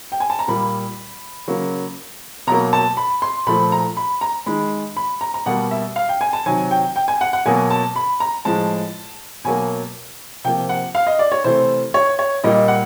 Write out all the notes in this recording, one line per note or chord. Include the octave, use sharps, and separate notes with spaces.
G5
G#5
A5
A#5
A#2 G3 A#3 B5
C#3 F#3 A#3
B2 F#3 A#3 A#5
A5
B5
C6
A#2 F3 A3 B5
A#5
B5
A#5
D#3 G#3 B5
B5
A#5
A#5
B2 G3 A#3 F#5
E5
F5
G5
G#5
A5
C3 D#3 F#3 G#5
G5
G5
G#5
F#5
F#5
B2 F#3 A#3 G#5
A5
B5
A#5
A2 F3 G#3 A5
B2 F#3 A#3 G#5
C3 F3 A#3 G5
F#5
F5
D#5
D5
C#5
C3 E3 A3 C5
C#5
C#5
A#2 G3 A#3 D#5
F#5